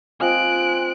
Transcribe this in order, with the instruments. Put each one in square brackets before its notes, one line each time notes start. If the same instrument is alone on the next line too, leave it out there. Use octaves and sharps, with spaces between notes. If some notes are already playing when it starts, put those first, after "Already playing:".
[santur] C4 F4 D#5 [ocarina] G#5 [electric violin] F#6 D7